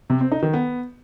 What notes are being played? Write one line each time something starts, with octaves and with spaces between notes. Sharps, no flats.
C3
C4
D#4
D#3
B3